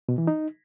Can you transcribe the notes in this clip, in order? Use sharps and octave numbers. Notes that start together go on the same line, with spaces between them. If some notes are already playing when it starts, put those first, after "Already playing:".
B2
E3
D#4